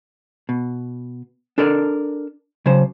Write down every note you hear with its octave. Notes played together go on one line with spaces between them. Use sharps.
B2
D4 A4 A#4 D5
C#3 F#3 C5